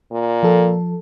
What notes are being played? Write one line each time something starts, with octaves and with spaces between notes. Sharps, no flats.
A#2
F3 A4